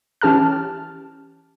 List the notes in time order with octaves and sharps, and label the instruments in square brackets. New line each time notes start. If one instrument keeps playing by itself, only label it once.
[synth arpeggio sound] E3 C#4 G4 A5 F6